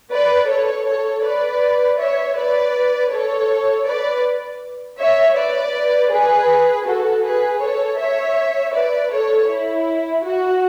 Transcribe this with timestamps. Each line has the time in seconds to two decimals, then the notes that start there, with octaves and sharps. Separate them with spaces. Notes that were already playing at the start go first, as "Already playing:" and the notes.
0.11 B4 D5
0.48 A4 C#5
0.86 A4 C#5
1.24 B4 D5
1.99 C#5 E5
2.36 B4 D5
3.11 A4 C#5
3.86 B4 D5
4.99 C#5 E5
5.36 B4 D5
6.11 G#4 B4
6.86 F#4 A4
7.24 G#4 B4
7.61 A4 C#5
7.99 C#5 E5
8.74 B4 D5
9.12 A4 C#5
9.49 E4
10.24 F#4